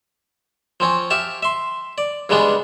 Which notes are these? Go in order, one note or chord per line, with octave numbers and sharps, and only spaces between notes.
F3 C4 C#4
G4 E5 F5 A5
E5 C6
D5
G2 C#3 G3 G#3 B3 D4